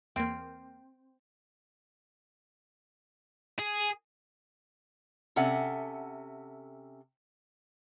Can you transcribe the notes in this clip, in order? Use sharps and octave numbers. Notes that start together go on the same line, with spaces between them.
E2 A#3 C4
G#4
C3 C#4 A4 E5 F#5